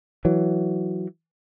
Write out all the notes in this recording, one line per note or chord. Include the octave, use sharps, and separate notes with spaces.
E3 F#3